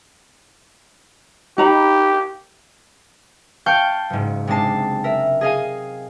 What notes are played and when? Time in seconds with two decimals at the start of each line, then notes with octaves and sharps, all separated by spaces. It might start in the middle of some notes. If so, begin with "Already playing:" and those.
1.58 D#4 G4 A#5 B5
3.66 F5 G5 A5 C#6 F6 G6
4.10 F#1 G#2
4.47 C3 G#3 D4 D#4 A5 C7
5.04 A#4 E5
5.41 G#4 D#5 F5 G#5